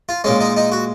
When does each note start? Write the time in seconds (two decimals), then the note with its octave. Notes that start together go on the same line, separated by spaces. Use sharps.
0.09 F4
0.24 A#2 G#3 C#4
0.41 D#4
0.56 D#4
0.72 F#4